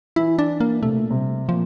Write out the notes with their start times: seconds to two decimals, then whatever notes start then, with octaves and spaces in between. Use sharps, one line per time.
0.16 E3 E4
0.39 D4
0.61 A#3
0.82 C3 A3
0.96 A#2
1.10 C3 G3
1.48 A#2 F3